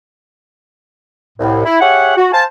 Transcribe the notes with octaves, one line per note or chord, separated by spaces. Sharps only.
C2 A2
E4
G4 G#4 C#5 E5 F#5
F#4
C5 F5 G#5 A5